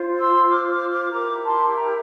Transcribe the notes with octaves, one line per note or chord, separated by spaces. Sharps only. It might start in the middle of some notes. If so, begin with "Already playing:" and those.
Already playing: F4 C5
C6 E6
D6 F6
D6 F6
D6 F6
E4 G4 A#4 A#5 D6
A5 C6
G5 A#5